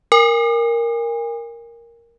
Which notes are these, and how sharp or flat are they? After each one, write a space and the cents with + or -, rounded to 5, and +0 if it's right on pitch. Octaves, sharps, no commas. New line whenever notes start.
A#4 +0 G#5 -40